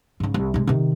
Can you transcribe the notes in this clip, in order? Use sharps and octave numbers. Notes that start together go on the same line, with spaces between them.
G#2 C#3
C2
C3 G#3
C3 D#3